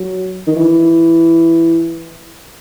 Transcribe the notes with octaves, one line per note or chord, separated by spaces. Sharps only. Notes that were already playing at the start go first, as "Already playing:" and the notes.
Already playing: F#3
D#3
E3